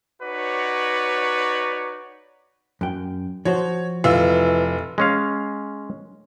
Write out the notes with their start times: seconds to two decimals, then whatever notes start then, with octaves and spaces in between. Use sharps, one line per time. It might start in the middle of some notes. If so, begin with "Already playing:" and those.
0.22 D#4 F#4 B4 C#5 D5
2.81 F#2 G5
3.45 F3 F#4 C5 C#5
4.04 F1 E3 F4 E6
4.98 G#3 C#4 F5